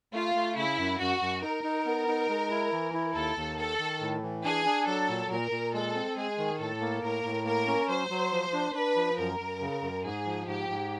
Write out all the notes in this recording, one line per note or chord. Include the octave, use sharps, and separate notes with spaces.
A3 F4
A3
C#3 E4
F#2
F#2 F#4
F#2
D#4 A#4
D#4
B3
D#4
G#3
E4
E3
E4
D#2 A4
D#2
D#3 A4
D#3
A2
E3
D4 G#4
D4
F#3 A4
A#2
A#2 A#4
A#2
G#3 A4
C4
G#3 G#4
D#3
A2 A4
A#3
A2 A#4
A2
A#3 A#4
C#4
F#3 C5
F#3
F3
D4
D4 B4
F3
F#2 A#4
F#2
C#3
F#2
G#2 G#4
F3
G#2 G4
G#2